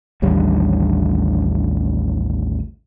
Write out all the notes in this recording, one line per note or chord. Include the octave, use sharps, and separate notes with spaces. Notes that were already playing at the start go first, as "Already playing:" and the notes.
A1 D#2 D3 G3